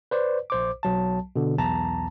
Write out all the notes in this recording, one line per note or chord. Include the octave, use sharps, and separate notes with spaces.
B4 C5 D5
A#1 C5 D6
B1 F#3 A5
B2 D3
B1 E2 A5 A#5